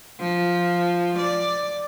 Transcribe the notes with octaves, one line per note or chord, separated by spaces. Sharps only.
F3
D5